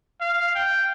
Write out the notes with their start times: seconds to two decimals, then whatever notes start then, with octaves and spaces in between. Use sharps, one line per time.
0.21 F5
0.55 G5